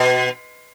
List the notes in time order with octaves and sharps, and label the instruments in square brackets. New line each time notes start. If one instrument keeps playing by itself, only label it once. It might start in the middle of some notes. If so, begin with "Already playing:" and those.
Already playing: [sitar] B2